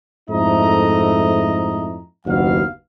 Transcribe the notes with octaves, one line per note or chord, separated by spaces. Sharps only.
F2 G#2 A3 E4 D#5 A#5
F#1 D#2 F#3 B3 F5